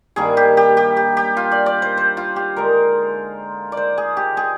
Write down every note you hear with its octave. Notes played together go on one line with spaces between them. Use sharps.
G2 D#3 G3 A#3 G#4
G4
G4
G4
G4
G4
F4
D5
D5
C5
C5
F4
G4
D3 G#3 D#4 A#4
D5
C5
G#4
G4
G#4